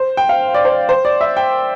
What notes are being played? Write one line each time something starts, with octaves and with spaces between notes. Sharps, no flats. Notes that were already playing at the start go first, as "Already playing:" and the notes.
Already playing: C5
G5
F5
D5
C5
C5
D5
E5
G5